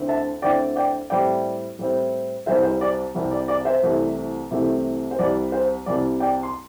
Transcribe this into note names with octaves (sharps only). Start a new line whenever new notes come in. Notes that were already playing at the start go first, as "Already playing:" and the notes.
Already playing: D2 D3 C4 E4
E5 A5
D2 D3 C4 E4 D5 G5
D5 G5
A2 G3 C4 E4 D5 G5
A2 G3 C4 E4
C2 C3 G3 C4 C5 E5
C5
D5
C2 C3 G3 C4
D5
D5
C5 E5
C2 C3 E3 A3
C2 C3 E3 A3
C5
C2 C3 G3 D5
C5
C2 C3 G3 D5
D5 G5
C6